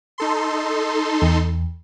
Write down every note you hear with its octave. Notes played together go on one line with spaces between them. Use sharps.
D#4 A4 C6
E2